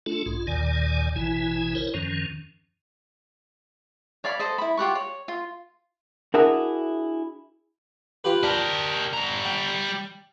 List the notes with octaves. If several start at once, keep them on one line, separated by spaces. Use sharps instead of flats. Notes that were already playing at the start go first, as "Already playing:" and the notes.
A3 D4 F4 A4
B1 G#2 F4
D#2 A#2 D#3 D5 G#5
A1 B2 E3 E4 G#5
E4 A#4 C5 C#5
F#2 D#3 F3 C#4
C#5 D5 F5 B5
A4 C5 D#5
E4 B5
F4 G4 F#5 C#6
C#5
F4
D4 E4 F#4 G#4 A#4 E5
F4 G4 B4
D4 G4 A#4
G3 A#5
G5